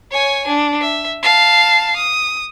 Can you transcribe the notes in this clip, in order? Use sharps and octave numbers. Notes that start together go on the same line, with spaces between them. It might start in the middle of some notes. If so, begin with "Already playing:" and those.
C#5 G#5
D4
E5
F5 A5
D#6